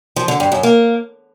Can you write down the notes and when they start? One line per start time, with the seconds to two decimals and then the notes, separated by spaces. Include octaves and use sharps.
0.16 F3
0.28 D3
0.40 G2
0.52 F#2
0.63 A#3